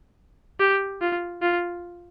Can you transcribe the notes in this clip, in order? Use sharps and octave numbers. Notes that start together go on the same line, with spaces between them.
G4
F4
F4